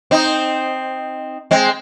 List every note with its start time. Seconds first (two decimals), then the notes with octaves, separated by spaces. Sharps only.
0.11 C4 D#4
1.51 G#3 C4